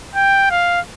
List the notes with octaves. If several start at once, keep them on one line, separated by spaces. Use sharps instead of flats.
G5
F5